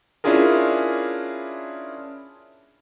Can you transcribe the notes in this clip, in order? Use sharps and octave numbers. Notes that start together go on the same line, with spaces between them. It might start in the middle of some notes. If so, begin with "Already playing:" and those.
C#4 D4 E4 F4 G#4 A#4